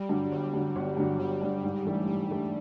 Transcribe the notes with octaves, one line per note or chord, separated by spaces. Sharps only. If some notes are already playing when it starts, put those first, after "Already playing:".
Already playing: G3
G2 D3 F#3
G1 G3
G2 D3 F#3
G1
G2 D3 F#3
G1 G3
G2 D3 F#3
G#2
E3 A3 D4 G4
G#2 G3
E3 A3 D4 G4